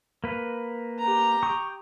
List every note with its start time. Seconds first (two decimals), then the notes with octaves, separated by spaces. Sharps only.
0.24 A#3 B4
0.99 G4 A#5
1.43 G5 C#6 D#6